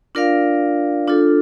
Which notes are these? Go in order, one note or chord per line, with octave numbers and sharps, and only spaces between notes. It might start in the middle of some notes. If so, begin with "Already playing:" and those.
D4 F4 A#4 D5 F5
D4 F4 A4